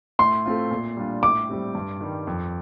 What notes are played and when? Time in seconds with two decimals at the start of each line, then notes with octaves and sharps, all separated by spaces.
0.19 A2 C6
0.45 A3 C4 F4
0.71 A#2
0.97 G3 D4 F4
1.23 A2 D6
1.49 G3 C4 G4
1.75 G2
2.01 D#3 G3
2.27 F2